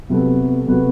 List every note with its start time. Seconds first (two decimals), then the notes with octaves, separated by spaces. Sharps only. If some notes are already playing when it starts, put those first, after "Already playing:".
0.10 C3 F#3 B3 F#4 A4
0.67 C3 F#3 B3 F#4 A4